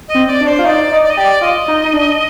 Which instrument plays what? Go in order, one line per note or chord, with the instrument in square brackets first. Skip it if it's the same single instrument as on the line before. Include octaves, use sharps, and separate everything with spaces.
[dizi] D#5
[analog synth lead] C4
[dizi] D5
[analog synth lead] D4
[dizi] C5
[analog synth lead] F4
[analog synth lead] D#4 [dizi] D5
[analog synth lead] D#4
[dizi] D5
D#5
[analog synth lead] G4 [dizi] D5
[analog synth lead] F4 [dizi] D#5
[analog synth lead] D#4
D#4
D4